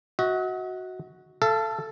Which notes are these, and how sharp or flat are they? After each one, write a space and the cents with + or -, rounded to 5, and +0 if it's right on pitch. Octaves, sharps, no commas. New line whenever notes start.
F#4 +0 D#5 +45
A4 +0 F5 -45